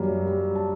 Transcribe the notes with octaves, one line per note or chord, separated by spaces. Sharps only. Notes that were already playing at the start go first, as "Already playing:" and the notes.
Already playing: F#2 G3 A#3
G3
A5